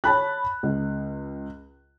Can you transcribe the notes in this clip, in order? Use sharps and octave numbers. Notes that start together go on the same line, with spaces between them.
C#5 A5 B5 F#6
C#2